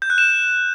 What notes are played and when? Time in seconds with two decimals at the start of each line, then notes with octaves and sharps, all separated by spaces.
0.02 G6
0.10 F#6
0.18 E7